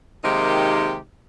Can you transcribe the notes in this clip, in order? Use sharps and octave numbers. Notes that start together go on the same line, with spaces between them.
C3 D#3 G#3 A#3 D#4 G4